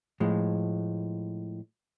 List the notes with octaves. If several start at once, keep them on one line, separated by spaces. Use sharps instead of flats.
A2 F3 G#3